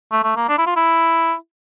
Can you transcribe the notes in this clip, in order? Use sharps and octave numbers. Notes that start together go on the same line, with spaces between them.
A3
A3
A#3
D4
E4
F4
E4